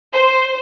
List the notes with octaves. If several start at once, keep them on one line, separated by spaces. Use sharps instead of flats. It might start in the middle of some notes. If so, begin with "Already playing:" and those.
C5